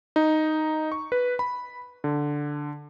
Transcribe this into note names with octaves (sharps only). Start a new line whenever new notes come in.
D#4
C#6
B4
B5
D3